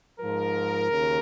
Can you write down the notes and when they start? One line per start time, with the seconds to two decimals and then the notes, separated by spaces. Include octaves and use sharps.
0.19 G#2 F3 A#4
0.91 D#2 C#3